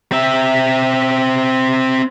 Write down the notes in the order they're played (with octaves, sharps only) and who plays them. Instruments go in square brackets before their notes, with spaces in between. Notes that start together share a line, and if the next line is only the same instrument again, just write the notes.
[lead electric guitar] C4 E5